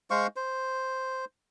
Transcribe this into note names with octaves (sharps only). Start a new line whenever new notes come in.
G#3 C5 F5 C#6
C5